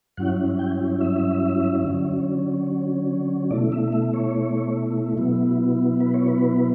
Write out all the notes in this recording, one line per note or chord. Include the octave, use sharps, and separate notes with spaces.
G2 F#3 C#4 E4 F#5
G5
E5
D3 F#3 C#4
B2 A3 E4 D5
E5
E5
C#5
B2 F#3 B3 E4
B4
C#5
B4